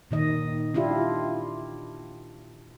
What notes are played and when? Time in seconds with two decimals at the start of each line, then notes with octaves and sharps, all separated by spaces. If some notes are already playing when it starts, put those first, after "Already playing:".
0.11 A#2 D#3 D#5
0.74 D4 E4 F4 G4